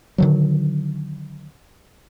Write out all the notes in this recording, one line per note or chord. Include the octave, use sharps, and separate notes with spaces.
D3 D#3 F#3